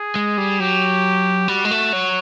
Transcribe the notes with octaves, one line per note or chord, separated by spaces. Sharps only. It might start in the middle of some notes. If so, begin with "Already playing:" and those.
Already playing: G#4
G#3
G3
F#3 G4
G3 F#4
G#3
A3
F#3